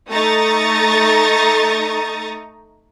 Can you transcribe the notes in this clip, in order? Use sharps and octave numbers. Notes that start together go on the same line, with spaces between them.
A3 D#4 A#5 C#6 D#6 A6